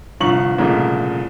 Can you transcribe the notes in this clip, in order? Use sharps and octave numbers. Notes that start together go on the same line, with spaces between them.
G1 C2 G2 F3 C#6 F#7
C2 A#2 C#3 F3 A3